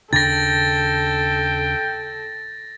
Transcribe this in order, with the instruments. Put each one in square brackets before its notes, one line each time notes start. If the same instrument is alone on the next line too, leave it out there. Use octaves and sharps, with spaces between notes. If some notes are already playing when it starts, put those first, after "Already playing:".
[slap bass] D#2 C#3 D4 [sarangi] A4 [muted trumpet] G5 [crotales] A6 A#6